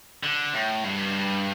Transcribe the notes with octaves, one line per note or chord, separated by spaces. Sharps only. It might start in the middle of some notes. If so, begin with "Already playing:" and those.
D3
A2
G2